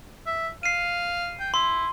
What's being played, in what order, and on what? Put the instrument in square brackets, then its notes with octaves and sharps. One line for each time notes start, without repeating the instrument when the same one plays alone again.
[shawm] E5
[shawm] F5 [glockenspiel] C7 D#7
[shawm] G5
[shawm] E4 [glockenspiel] C6